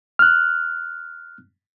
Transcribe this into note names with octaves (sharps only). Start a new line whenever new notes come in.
F6 F#6